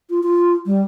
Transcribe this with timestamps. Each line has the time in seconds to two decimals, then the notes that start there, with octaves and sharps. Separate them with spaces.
0.10 F4
0.23 F4
0.66 G3